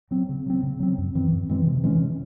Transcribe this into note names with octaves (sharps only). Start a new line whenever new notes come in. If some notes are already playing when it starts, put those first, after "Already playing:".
F#3 C4
C#3
F#3 C4
C#3
F#3 C4
F#2
E3 C4
F#2
E3 G#3 C4
C3
E3 G#3 C#4